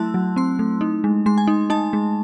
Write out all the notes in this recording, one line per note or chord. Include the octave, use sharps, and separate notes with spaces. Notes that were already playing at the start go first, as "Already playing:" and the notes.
Already playing: F#3 A3 E4 A5 C6 E6 F#6
F#3
C4 C6
A3
D#4
G#3
G#3 C6
G#5
D#4
D#4 A5
G#3